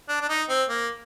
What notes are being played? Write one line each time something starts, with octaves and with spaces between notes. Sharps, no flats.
D4
D4
D#4
C4
A#3